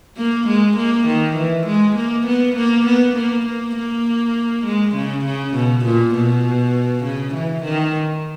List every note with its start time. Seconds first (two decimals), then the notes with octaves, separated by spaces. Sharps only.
0.18 A#3
0.48 G#3
0.77 A#3
1.07 D#3
1.36 E3
1.67 G#3
1.96 A#3
2.27 B3
2.56 A#3
2.86 B3
3.16 A#3
3.46 A#3
3.76 A#3
4.65 G#3
4.95 C#3
5.25 C#3
5.55 B2
5.85 A#2
6.15 B2
7.04 C#3
7.34 E3
7.64 D#3